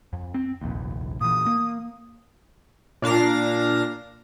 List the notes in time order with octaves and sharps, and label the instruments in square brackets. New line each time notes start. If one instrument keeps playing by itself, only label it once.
[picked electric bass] F2
C4
F1 A#1 D#2
[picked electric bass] A#2 E3 [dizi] D#6
[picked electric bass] A#3
[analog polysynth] A#2 D4 F5 A#6